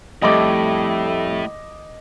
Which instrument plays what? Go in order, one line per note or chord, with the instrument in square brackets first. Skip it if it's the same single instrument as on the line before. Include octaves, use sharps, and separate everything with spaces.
[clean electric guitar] F2 G3 A3 [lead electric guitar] A2 [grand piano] D#5 D6